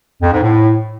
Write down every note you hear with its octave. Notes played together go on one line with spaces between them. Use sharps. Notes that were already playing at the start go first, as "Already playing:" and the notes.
F2
G#2
A2